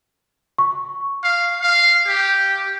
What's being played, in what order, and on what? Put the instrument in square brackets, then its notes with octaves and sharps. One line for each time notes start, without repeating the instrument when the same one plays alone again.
[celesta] C#6
[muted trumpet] F5
F5
G4